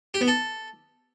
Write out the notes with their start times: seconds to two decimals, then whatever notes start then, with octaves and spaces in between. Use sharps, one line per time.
0.14 G4
0.21 B3
0.28 A4